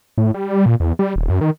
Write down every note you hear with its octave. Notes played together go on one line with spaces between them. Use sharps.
A2
G3
G3
A#2
E2
G3
D#1
F#2
D#3